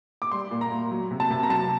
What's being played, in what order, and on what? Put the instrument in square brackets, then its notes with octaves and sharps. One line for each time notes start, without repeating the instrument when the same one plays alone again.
[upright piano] D6
G3 C6
A#2
A#5
A#2
F#3
C3
A5
C3
A#5
F#3 A5